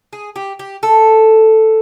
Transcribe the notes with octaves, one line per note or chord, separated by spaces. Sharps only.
G#4
G4
G4
A4